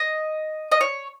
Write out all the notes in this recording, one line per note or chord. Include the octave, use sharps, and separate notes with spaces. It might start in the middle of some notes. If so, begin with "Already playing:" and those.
Already playing: D#5
D#5
C#5